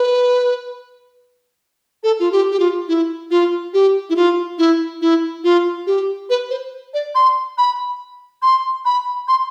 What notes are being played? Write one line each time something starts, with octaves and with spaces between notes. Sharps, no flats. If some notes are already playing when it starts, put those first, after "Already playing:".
Already playing: B4
A4
F4
G4
G4
F4
E4
F4
G4
E4
F4
E4
E4
F4
G4
B4
C5
D5
C6
B5
C6
B5
C6